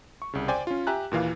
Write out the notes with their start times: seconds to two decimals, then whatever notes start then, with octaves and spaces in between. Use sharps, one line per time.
0.22 C#6
0.33 C2 C#3
0.48 C5 D5 G5 G#5
0.67 C#4 F4
0.87 G4 E5 G#5 A#5 F#6
1.11 D#2 A#2 E3 F5